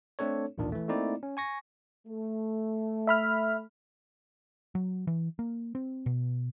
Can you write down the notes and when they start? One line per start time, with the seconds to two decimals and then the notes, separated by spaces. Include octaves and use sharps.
0.19 A3 C4 D4 A4 C#5
0.58 A1 D#2 A#2 D#3 D4
0.72 E3 A3
0.88 A3 A#3 C4 D#4 E4 D5
1.23 C#4
1.37 G#5 C#6 A#6
2.07 A3
3.07 E5 B5 F6
4.75 F#3
5.07 E3
5.39 A#3
5.75 C4
6.06 B2